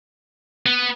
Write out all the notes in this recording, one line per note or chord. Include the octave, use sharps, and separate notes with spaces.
B3